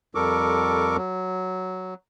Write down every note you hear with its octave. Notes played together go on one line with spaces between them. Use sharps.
F2 G3 A4 A#4 C#6 D6
F#3